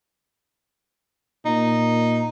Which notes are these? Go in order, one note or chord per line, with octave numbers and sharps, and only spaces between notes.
A#2 D#4